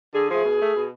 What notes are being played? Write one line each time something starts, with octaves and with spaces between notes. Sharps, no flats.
D3 G#4
F3 A3 G#4
B2
A3
B2